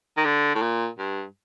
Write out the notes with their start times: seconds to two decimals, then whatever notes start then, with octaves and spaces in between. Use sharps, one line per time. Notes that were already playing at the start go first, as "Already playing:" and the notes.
0.17 D#3
0.25 D3
0.55 A2
0.62 A#2
0.99 G2